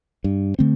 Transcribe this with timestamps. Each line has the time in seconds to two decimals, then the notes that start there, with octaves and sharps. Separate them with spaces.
0.24 G2
0.59 D3 A3 C4